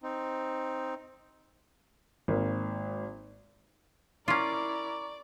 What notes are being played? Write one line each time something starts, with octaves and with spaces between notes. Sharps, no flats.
C4 D#4
G#1 A#3 A#4
C#4 E4 F4 A#4 D5 A#5 C#6 D6